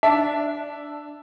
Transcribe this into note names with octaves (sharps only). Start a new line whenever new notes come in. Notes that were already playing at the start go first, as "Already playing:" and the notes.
D4 E5